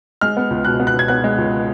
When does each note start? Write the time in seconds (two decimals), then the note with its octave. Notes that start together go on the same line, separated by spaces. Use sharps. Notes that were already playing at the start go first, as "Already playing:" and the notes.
0.21 G#3 F6
0.37 B3
0.50 C#2
0.65 B2 F#6
0.80 B3
0.87 F#6
0.94 B2
0.99 G#6
1.08 B3 F#6
1.24 G#3
1.38 C#2